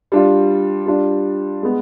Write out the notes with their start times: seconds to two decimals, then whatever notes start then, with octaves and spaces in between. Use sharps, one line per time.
0.12 G3 D4 F4
0.86 G3 D4 F4
1.63 G#3 B3